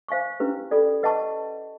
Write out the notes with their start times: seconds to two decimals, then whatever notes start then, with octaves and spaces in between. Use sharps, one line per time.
0.08 C5 F5 G#5 C#6
0.40 C#4 E4 G4 B4
0.71 A4 D5 G5 B5
1.03 B4 D#5 F#5 A5 C#6